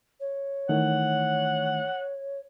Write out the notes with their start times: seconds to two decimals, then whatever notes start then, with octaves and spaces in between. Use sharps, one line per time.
0.20 C#5
0.69 D#3 E3 A3 F#5